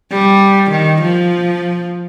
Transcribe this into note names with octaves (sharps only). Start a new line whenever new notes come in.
G3
D#3
F3